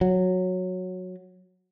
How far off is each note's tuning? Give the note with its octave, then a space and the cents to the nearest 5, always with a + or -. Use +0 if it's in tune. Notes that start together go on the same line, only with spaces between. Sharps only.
F#3 -10